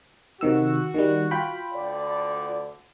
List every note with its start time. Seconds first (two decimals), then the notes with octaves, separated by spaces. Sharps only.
0.41 C3 D#3 F#4 E6
0.94 D#3 G3
1.31 F4 G5 B5
1.73 D2 D3 D5